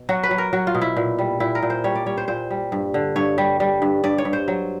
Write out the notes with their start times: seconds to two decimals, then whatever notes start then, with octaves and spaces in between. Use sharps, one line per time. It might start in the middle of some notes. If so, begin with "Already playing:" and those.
Already playing: B2
0.09 F#3 F#4
0.23 B4
0.31 F#3
0.38 A#4
0.53 F#3 F#4
0.67 F4
0.75 B2
0.81 E4
0.97 A#2
1.19 G3
1.40 A#2 E4
1.55 A#4
1.62 A#2
1.70 C5
1.84 G3 C#5
1.95 D5
2.06 G3 C#5
2.17 C5
2.28 A#2 C5
2.51 G3
2.72 G2
2.94 D3
3.16 G2 C#5
3.38 G3
3.60 G3
3.82 G2
4.04 G2 D5
4.18 C#5
4.25 G2
4.33 C5
4.48 F#3